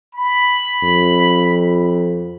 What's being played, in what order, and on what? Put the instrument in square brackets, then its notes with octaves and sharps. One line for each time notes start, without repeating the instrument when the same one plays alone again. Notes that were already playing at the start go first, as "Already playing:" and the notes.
[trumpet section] B5
[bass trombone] F2